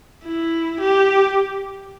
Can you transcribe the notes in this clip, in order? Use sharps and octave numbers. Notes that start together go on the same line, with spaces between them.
E4
G4